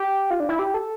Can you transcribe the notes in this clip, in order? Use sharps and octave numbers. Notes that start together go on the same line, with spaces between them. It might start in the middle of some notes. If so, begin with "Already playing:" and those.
Already playing: G4
F4
D4
E4
G4
A4